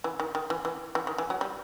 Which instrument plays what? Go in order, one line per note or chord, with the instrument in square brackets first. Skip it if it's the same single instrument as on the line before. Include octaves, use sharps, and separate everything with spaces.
[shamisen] E3
D#3
D#3
E3
E3
E3
D#3
E3
F#3
G3